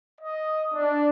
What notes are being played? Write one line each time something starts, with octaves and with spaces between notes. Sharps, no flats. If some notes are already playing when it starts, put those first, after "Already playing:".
D#5
D4